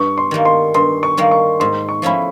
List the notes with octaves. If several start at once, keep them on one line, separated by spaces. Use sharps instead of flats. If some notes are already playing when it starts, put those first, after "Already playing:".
Already playing: G2 C#6
C6
D#3 G3 A#3
C6
G2 C6
C#6
D#3 G3 A#3
C#6
G#2 C6
C#6
F3 A3 C#4 E4 B5